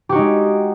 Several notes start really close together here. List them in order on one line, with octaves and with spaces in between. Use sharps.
G4 F#4 D#4 G#3